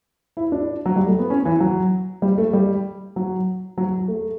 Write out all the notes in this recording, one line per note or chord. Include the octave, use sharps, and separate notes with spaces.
E4
D4
F#3
G3
A3
B3
C#4
E3
F#3
G3
A3
G3
F#3
F#3
A3